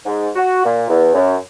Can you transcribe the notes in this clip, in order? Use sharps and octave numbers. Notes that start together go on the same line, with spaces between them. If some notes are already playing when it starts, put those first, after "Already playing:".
G#2
F#4
A#2
E2
F#2